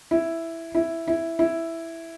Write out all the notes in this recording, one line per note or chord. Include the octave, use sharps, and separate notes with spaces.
E4
E4
E4
E4